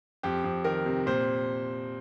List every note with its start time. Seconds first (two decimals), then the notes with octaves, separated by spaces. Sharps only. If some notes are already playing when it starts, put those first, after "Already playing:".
0.23 F2 G4
0.44 F2
0.64 D#3 A#4
0.86 C3
1.06 A#2 C5